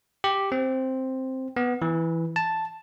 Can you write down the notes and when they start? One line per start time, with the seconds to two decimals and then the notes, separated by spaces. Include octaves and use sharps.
0.24 G4
0.52 C4
1.56 B3
1.82 E3
2.36 A5